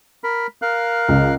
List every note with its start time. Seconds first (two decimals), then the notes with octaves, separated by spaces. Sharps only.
0.24 A#4 B5
0.62 A#4 F5 F#6
1.08 C#2